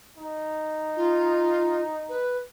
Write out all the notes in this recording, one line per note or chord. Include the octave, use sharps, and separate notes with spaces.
D#4
F4
B4